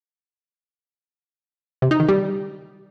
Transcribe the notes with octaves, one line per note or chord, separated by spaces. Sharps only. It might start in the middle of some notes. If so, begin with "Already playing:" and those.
C3
D#4
D#3
G3